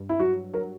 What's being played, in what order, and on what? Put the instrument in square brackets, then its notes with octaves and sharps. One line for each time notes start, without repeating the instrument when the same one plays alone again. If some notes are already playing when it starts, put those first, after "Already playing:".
Already playing: [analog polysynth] G2
[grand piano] E4
[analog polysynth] F#3 [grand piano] F#4
[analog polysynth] F#3 [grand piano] A#4